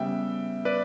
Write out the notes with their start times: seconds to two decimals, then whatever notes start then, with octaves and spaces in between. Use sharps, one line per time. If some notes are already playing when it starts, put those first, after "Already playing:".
Already playing: C#3 G3 B3 E5 G5
0.65 B4 D5